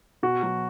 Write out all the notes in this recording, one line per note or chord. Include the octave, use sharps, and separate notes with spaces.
B2 F#4
F#3